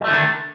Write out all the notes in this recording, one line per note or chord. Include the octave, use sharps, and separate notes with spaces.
D3 D#3 F3 G3 A3